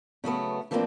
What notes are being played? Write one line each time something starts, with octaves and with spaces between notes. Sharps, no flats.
C#3 F#3 A3 B3
E3 F3 A3 A#3 C4 D4